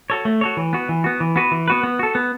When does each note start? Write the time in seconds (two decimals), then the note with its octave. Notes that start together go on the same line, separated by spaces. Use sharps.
0.10 F#4 A4 C#5
0.25 A3
0.41 F#4 A4 C#5
0.57 E3
0.73 B3 F#4
0.89 E3
1.04 B3 F#4
1.20 E3
1.36 B3 F#4 B4
1.51 E3
1.68 B3 F#4 B4
1.84 B3
1.99 F#4 A4
2.15 B3